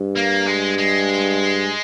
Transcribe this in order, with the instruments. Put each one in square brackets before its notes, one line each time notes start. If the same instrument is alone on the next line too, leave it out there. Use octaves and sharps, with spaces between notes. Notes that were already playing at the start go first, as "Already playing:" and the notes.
Already playing: [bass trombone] G2
[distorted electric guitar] A#3
G#3
G#3